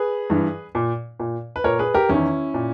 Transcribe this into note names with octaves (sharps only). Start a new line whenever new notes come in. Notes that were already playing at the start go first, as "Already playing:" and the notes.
Already playing: G#4 B4
G2 E3
A#2
A#2
B4
A#2 A#4 C#5
G#4 B4
G4 A#4
E2 D#3 C#4 E4
A#2